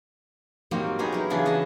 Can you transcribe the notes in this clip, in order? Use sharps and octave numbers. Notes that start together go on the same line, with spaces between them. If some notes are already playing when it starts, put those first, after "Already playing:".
F#3 G3 A#3 C4 D#4 F#4
B3 C#4 D#4 G4 G#4 A#4
F#3 E4
C#3 E3 B3 C#4 D4 B5
F#4 D#5 A5 B5